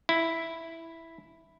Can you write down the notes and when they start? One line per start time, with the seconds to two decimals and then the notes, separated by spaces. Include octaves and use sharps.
0.09 E4